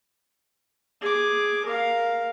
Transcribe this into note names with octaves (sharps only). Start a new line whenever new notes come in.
G#4 D6
A#4 F5